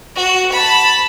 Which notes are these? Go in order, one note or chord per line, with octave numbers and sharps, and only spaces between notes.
F#4
A5 B5